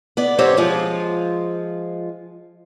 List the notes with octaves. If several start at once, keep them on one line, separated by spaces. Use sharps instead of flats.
B3 D5
F#2 C4 G4 C5 C#5 F#5
F3 G#3 F4